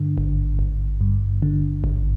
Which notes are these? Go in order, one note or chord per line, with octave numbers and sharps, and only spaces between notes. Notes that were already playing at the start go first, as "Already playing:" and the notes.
Already playing: G2 D3
G#1
G#1
G2
D3
G#1